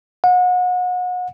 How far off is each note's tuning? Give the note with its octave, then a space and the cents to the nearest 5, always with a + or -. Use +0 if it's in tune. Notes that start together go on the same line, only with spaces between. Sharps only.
F#5 -35